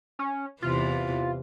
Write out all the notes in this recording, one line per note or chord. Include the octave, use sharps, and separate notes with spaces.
C#4
E2 C3 E3 F4